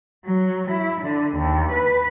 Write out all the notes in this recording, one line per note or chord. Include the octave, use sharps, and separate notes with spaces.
F#3
E4
D3
D#2
B4